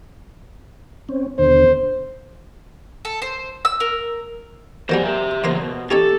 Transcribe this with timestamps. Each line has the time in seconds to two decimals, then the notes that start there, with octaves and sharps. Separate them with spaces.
1.09 C4 C#4
1.38 D#2 B2 D3 C5
3.05 A4
3.22 C5
3.65 E6
3.80 A#4
4.89 D#3 F#3 G3 C5 G#5
5.03 G4 E5
5.44 D#2 C#3 A#3 C5 D#5
5.58 B2
5.91 C#4 D#4 G4 A4 C#5